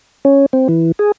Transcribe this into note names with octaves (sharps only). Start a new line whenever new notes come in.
C#4
C4
E3
G#4